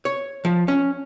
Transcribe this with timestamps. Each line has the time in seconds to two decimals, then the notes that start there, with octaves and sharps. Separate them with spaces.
0.05 C#5
0.45 F3
0.68 C#4